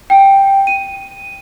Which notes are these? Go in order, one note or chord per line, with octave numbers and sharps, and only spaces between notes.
G5
D#7